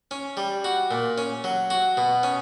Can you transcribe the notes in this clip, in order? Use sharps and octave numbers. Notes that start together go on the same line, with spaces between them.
C#4
G3
F#4
A#2
C#4
F#3
F#4
B2
C#4